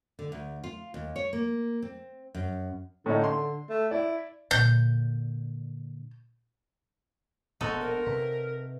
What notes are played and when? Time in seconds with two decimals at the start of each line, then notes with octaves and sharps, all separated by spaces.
0.19 D3
0.32 D2
0.64 F4
0.94 D#2
1.16 C#5
1.33 A#3
1.82 C4
2.34 F#2
3.06 A2 D3 C#4 D#4
3.24 C6
3.70 A3
3.91 E4 D5
4.51 A#2 D3 G6
7.61 E1 A#1 B3 D4 D#4 F#4 A4 C6
7.81 A#4
8.06 C3 B4